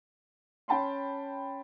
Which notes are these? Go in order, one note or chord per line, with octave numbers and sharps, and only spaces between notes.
C#4 G5 A5 B5 C6